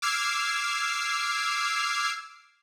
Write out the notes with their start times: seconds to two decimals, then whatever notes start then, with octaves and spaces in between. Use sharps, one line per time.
0.02 D6 E6 F6 G#6 C7